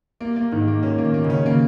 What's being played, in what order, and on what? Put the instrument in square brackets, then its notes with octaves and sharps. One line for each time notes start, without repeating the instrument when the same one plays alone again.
[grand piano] A#3
A#3
[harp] G#2 [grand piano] D#3
[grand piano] A#3
[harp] A#2 [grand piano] C#4
[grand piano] A#3
[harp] D#3
[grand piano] A#3
[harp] C#3
[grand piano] C#4
[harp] C#3 [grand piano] A#3